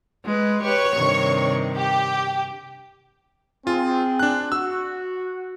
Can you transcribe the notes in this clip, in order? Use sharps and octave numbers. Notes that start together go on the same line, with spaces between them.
G#3 B4
G4 B4 C#5 C#6
G2 C3 D#3
G4
C4 F4 G#4
D4 F#6
F#4 E6